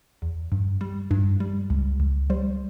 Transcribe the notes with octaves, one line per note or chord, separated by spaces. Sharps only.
E2
G2
G3
G2
G3
C#2
C#2
G3 C5